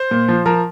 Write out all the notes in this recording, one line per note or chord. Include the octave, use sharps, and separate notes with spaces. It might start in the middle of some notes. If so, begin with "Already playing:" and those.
Already playing: C5
A#2
F3
F3 A#4